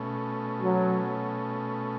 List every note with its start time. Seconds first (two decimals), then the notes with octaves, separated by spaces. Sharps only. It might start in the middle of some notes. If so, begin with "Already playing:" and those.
Already playing: B2 A3 C#4
0.61 F#3